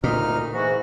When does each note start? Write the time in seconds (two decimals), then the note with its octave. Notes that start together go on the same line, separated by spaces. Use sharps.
0.04 D2 A#2 D#4 F6
0.54 G#2 E3 F#4